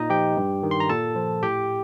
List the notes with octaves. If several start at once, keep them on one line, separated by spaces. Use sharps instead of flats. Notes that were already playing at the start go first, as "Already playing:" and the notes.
Already playing: A#2 D#4 D#5
F3 G4 G5
G2
D#3
C6
A#5
A#2 A4 A5
F3
A2 G4 G5